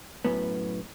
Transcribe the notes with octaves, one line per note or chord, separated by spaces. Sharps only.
F#2 A2 B3